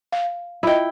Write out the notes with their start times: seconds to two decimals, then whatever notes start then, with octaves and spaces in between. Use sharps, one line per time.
0.12 F5
0.63 E4 F4 D#5 G5